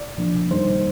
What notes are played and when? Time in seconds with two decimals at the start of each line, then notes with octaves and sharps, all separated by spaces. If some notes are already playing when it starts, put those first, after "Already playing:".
Already playing: D5
0.17 C2 A#2 F3 A#3 D4
0.51 F2 D#3 G3 A#3 D#4 C5